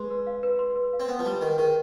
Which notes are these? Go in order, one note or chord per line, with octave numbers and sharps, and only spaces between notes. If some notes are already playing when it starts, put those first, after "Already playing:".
Already playing: G#3 B4 C6
B4
F5
B4
C6
B4
F5
C4
B3 B4
F3
G3 C6
D#3 B4
D#3 G#4